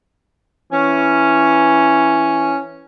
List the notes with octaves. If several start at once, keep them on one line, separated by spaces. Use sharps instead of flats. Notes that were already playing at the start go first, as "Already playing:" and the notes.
E3 C#4